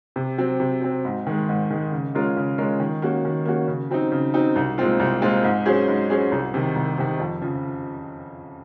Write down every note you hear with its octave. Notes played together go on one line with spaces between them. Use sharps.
C3
F#3 C4
C3
F#3 C4
G#2
D#3 G#3
G#2
D#3 G#3
C#3
G#3 C#4 F4 A#4
C#3
G#3 C#4 F4 A#4
D#3
A#3 C#4 F#4
D#3
A#3 C#4 F#4
C#3
F#3 C4 D#4
C#3
F#3 C4 D#4
C2
A#2 G#3 C4 F4
C2
A#2 G#3 C4 F4
G#2
F#3 C#4 G#4 C5
G#2
F#3 C#4 G#4 C5
C2
C3 D#3
C2
C3 D#3
F2
C#3 F3